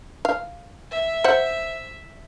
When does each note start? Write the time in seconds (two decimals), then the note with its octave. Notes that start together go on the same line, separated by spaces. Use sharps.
0.25 F5
0.91 E5
1.24 C5 F#5